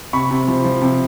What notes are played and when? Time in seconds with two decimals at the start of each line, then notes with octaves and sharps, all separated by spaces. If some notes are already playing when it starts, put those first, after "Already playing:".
0.13 C3 B5 C#6
0.31 C3
0.48 F3
0.64 F3
0.82 C3